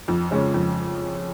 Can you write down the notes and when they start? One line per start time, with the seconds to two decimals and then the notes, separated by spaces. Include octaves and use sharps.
0.08 F2
0.31 C#3 G#3 C#4
0.54 F2